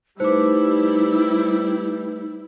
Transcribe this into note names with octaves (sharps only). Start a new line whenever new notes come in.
G3 A3 D#4 E4 B4 C5 D6